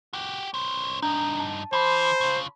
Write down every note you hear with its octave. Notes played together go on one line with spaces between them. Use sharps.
F#4 G4
C#4 C5
G2 D4 D#4 A#5 G6
A5
E3 C5 A5 B5 C6
C#3 F4